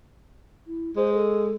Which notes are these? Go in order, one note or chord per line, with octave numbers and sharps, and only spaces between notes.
E4
G#3 C5
A4